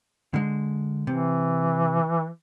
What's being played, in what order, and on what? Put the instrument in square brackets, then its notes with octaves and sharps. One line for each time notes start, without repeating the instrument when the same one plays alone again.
[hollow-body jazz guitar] D3 G#3
[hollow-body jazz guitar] C3 [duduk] E3